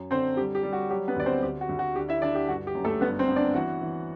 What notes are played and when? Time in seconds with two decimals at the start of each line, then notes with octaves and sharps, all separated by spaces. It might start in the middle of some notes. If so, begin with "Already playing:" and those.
Already playing: F#2
0.11 D3 C4 C5
0.37 G3 G4
0.55 G4
0.63 G3
0.73 F#4
0.90 F#3 G4
1.08 B3 B4
1.16 D2 D5
1.26 C4 C5
1.43 D2 G4
1.61 F#4
1.69 D2
1.79 F#4
1.95 D3 G4
2.09 E4 E5
2.22 D3 D4 D5
2.35 G4
2.49 G1 F#4
2.67 G4
2.75 F#2
2.85 A3 A4
3.01 G1 B3 B4
3.19 C4 C5
3.28 B3
3.36 D4 D5
3.54 E3 F#4 F#5
3.81 E3